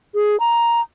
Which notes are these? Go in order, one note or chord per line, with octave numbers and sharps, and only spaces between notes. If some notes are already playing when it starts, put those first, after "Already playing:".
G#4
A#5